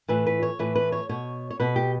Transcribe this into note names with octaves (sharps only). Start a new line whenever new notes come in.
A2 E3 B4
B4
C#5
A2 E3 B4
B4
C#5
B2 C#5
C#5
B2 B4
G4